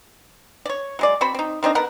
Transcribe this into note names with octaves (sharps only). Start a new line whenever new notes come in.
C#5 D5
F#3 G#3 D5
C4 F#4 C5 B5
C4 D#4
D#3 C4 D4 D#4
B2 B3 A#4 F#5